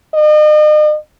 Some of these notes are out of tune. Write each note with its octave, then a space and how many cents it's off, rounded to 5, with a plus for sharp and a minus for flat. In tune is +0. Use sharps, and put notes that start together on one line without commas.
D#5 -40